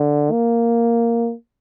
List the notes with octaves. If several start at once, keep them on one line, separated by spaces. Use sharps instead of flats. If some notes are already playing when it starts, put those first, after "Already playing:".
Already playing: D3
A#3